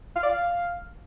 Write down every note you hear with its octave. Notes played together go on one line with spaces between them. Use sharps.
F5
D5
F5